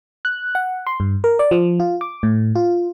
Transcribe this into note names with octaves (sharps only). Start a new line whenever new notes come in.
F#6
F#5
C6
G2
A#4
D5
F3
F4
D6
A2
F4